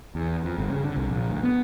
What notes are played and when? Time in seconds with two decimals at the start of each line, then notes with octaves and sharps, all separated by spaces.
0.15 E2
0.44 F2
0.58 G1
0.70 C#3
0.84 D3
0.97 C2
1.10 A#1
1.30 D2
1.43 B3